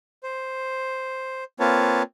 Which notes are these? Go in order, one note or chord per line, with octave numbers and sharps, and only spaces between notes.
C5
A#3 C4 F4 B4 C#5 A5